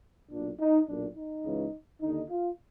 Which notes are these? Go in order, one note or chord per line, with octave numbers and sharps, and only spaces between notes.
B1 A#2 D4
D#4
B1 A#2 D4
D#4
C#2 C#3 E3
D#2 D3 D#4
F4